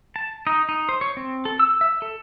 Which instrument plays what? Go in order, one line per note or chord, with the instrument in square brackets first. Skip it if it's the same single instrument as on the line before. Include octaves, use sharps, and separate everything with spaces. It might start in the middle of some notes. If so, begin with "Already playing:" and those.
[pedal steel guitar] A5
D#4
D#4
C5
C#5
C4
A4
E6
E5
A4